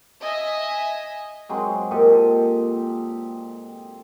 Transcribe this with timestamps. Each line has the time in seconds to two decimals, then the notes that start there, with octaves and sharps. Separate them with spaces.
0.21 D#5 E5 G#5
1.49 F#3 G#3 C4
1.91 A#2 G4 A4 D#5